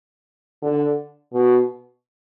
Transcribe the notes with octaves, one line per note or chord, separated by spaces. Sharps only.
D3
B2